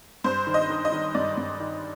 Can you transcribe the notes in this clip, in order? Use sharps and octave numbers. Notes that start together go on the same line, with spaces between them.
G2 C5
D#3
D#5
D#3
D#5
D#3
G2 D5
G2
D#3